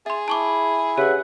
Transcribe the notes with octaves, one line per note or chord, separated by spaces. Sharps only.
G#4 E5 C6
E4 A5 C#6 D6
C#3 G4 B4 E5 F#5